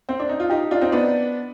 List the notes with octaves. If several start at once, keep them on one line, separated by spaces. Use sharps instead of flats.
C4
D4
D#4
F4
D#4 G4
D4 F4
C4 D#4
B3 D4